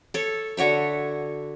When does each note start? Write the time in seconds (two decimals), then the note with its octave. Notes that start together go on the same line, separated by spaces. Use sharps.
0.14 A4 C#5
0.57 D3 F#4 C#5 E5